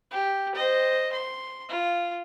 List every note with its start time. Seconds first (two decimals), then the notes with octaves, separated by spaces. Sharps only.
0.11 G4
0.55 C5 D#5
1.12 C6
1.69 F4